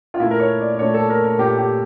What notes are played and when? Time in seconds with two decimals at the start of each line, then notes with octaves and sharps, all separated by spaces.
0.14 F4
0.20 A#2 A3 E4
0.31 A#4
0.40 C#5
0.60 D5
0.74 D5
0.79 A#2 A3 C#5
0.94 A4
1.09 A#4
1.24 A#4
1.38 A#2 A3 G4
1.58 G4